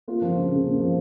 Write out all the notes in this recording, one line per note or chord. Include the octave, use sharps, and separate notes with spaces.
A#3 F4
F3
C#3
C#3
A#3
F3